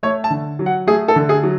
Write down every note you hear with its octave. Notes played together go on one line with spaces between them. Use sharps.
A3 C#5
A5
D3
F#3
F#5
A3 G#4
A4
D3
G#4
F#3